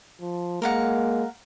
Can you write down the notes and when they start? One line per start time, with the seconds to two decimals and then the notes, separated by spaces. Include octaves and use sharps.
0.21 F3
0.62 G#3 A#3 A#4 F5 F#5